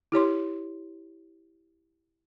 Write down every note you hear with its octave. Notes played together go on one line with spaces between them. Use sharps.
E4 G4 C#5 C6